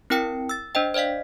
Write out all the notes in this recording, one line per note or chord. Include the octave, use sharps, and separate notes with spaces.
C4 E4 A#4 G5 C#7
E6 A6
D4 C5 D#5 G5
C5 D5 D#5 F5 B6